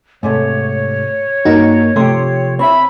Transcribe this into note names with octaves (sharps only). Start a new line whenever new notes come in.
G#2 C3 A3 C#5
G2 A#3 D#4 F#4 A#4
C3 F3 A3 G4 C6
C4 E4 C#5 E5 B5